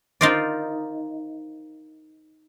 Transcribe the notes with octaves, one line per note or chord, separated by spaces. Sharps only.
D#4 F4 A#4 C5 D5